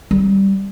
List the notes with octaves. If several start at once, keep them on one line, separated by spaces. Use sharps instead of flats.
G3